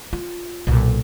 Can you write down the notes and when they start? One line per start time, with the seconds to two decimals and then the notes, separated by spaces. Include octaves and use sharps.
0.13 F4
0.67 B1 A#2